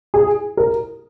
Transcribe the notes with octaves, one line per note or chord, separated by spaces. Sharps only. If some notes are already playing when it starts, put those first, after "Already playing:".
G#4
A#4